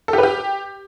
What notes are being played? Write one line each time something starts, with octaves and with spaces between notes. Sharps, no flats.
A4
G4
B4
G4